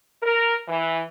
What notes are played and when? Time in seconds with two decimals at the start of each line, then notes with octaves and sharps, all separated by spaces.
0.23 A#4
0.67 E3